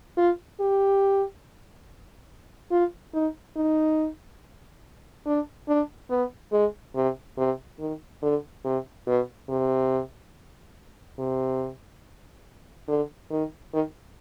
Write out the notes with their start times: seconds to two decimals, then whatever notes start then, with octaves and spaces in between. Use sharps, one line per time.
0.17 F4
0.60 G4
2.71 F4
3.14 D#4
3.56 D#4
5.26 D4
5.68 D4
6.10 B3
6.52 G#3
6.96 C3
7.38 C3
7.79 D#3
8.22 D3
8.65 C3
9.07 B2
9.49 C3
11.19 C3
12.88 D3
13.30 D#3
13.73 D#3